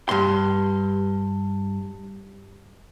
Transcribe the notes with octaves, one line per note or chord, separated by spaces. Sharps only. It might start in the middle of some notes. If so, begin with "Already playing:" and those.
G2 C6